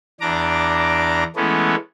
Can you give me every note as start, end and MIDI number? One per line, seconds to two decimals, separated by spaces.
0.21 1.24 40
0.21 1.24 62
0.21 1.24 82
0.21 1.24 86
1.36 1.75 52
1.36 1.75 56
1.36 1.75 57
1.36 1.75 59
1.36 1.75 61